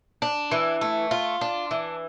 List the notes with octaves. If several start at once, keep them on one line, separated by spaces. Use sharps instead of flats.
D4
E3
A3
F4
D4
E3